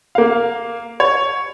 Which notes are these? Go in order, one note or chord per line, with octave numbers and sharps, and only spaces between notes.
A#3 F5
C#5